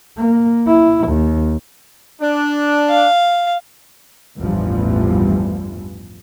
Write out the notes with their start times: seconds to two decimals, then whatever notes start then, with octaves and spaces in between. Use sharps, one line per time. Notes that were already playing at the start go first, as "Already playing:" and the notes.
0.18 A#3
0.67 E4
1.08 D#2
2.22 D4
2.89 F5
4.39 A1 E2 G2 E3 F3 G3